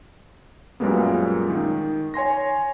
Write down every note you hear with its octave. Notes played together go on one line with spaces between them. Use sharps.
F#2 A#2 G3 G#3 A#3 B3
D#3
C#5 G#5 C6 A#6